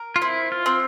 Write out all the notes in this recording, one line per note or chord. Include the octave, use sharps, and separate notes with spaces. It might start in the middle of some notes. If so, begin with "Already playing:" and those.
Already playing: A#4
F4
C4 E4
F4
C4